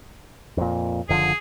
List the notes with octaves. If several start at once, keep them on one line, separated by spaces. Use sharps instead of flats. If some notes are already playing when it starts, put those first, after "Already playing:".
F2 A#2
F#1 D3 F3 G#4